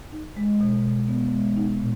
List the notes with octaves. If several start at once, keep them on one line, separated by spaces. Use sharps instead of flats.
D#4
G#3
B2
B2
B3
G#3
D#4
A#2